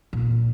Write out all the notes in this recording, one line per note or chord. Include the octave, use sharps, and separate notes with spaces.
A#2